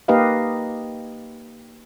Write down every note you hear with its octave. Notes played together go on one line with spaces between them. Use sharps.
A#3 D#4 G4 B4 D#5 F5